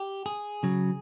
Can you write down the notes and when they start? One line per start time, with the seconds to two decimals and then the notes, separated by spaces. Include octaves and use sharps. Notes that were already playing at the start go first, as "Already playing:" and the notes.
Already playing: G4
0.26 G#4
0.63 C#3 F#3